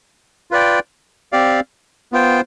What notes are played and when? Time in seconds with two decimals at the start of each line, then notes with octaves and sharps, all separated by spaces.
0.51 F4 B4 D5 G5
1.32 C4 G4 D5 F5
2.12 B3 F4 C5 G5